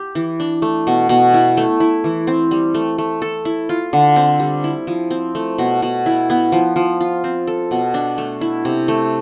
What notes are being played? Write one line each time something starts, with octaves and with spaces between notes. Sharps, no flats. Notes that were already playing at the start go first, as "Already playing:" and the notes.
Already playing: G4
E3
D4
A3
B2
B2
E4
A3
E4
E3
C4
G3
A3
A3
A4
E4
F4
D3
C4
G3
E4
F3
C4
A3
B2
B2
E4
B3
F3
F3
F4
C4
A4
B2
D4
A3
E4
C3
A3